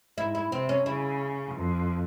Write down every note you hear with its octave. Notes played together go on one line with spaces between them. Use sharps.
G#2 E4
E4
C3 C4
C#4
C#3 E4
F2